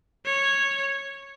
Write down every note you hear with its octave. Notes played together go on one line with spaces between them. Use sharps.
C#5